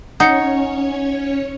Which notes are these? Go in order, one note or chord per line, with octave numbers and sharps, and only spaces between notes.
C#4 D#4 C#5 F#5 C#7